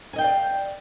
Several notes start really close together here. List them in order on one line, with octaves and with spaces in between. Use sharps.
G#5 D#5 G5 F5 D5